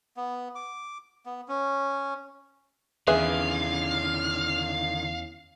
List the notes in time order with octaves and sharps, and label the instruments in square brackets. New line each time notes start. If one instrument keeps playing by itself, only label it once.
[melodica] B3
D6
B3
C#4
[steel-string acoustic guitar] E2 C#4 [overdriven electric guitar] D3 D#3 [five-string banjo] G#4 B4 E5 [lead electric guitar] F5